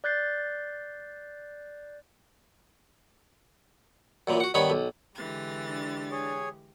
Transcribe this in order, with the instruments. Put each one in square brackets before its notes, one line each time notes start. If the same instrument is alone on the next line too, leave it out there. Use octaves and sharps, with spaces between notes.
[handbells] D5 F#6 G6 A6 C7
[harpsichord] F#2 A#2 E3
F#4 F#5
G2 D#3 B3 C#5 B5
B1
[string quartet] D3 E3 A6 [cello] G#3 G4
[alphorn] D4
[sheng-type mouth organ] G#4 C#5